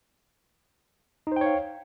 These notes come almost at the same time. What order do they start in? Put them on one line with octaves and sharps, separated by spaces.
D#4 C5 G5 C#5 F5